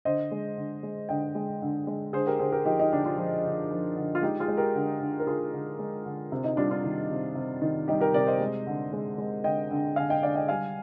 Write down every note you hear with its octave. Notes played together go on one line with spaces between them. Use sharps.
D3 C5 D#5
G#3
D3
G#3
D3 D#5 G5
G#3
D3
G#3
D3 G#4 C5
G4 A#4
D3 G#4 C5
G4 A#4
F3 D#4 G4
D#4
D3 D4
D4 F4
F3
D3
F3
D3
F4
G#3 D#4 G4
F4 G#4
G#3
G4 A#4
D3
D3
A#4
D3 F4 G#4
D3
G#3
D3
C3
D#4
G3 D4 F4
D4 F4
D#3
C3
C3
D#3
G3 D#4 G4
G4 A#4
C3 A#4 D5
C5 D#5
G#3
D3
G#3
G#3
D3 D#5 G5
D3
D3 F5 G#5
D#5 G5
D3 D5 F5
D#5 G5
G3 F5 G#5